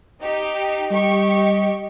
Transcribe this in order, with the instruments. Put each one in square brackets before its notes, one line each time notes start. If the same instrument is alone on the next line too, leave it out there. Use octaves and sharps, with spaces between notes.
[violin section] D#4 G4
[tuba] G3 [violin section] G4 C#6 [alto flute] D#5